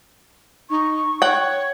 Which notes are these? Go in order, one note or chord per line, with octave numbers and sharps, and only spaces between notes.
D#4 C#6
C#5 F#5 G5